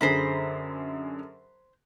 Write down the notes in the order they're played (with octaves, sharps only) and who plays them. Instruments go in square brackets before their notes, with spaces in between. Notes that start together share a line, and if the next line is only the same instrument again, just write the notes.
[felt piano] F#2 D3 G#4 [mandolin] C5 A#5 B5